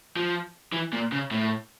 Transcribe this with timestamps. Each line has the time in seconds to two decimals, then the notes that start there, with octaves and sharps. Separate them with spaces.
0.16 F3
0.73 E3
0.93 A#2
1.12 C#3
1.31 A2